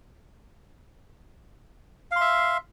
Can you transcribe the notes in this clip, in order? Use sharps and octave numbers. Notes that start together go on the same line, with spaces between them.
E5 F5 C6